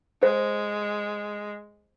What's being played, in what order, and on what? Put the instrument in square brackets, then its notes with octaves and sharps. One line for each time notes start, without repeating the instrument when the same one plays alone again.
[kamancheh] G#3 [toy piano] C5